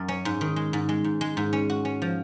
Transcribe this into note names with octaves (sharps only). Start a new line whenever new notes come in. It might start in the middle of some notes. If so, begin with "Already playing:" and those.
Already playing: F#2
C#4
G#2
D#3
G#3
G#2
G#3
G#2
G#3
G#2
C#4
F#4
C#4
F3